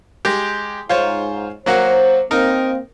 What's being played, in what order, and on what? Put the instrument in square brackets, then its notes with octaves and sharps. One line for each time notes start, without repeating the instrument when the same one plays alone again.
[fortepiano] G#3 G4
[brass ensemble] G#2 [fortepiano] F4 C5 C#5
[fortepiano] F#3 A#3 F#4 [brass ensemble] C5
[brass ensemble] A#3 C4 [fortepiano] D#4 A#4